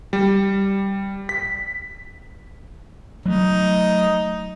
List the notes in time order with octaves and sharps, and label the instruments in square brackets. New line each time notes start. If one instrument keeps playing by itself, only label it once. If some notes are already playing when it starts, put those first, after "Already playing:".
[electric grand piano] G3
B6
[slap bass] F#3 A3 [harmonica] D#4